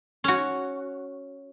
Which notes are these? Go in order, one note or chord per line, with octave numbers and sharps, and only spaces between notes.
C#4 F#4